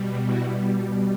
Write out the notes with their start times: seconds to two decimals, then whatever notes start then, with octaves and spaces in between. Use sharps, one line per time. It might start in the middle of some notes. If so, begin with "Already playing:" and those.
Already playing: B2 G3
0.23 E4 F#4